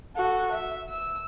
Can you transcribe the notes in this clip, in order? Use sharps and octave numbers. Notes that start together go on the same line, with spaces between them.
F#4 A4
E5
E6